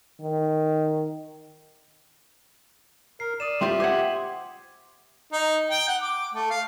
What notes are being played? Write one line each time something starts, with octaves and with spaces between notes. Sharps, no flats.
D#3
A#4 C7
D5 D#6 D#7 E7
G3 C4 F4 G4 E5 C6
C5 F#5 D6 G#6 F#7
D#4
G5
F#5
D6
A3
F5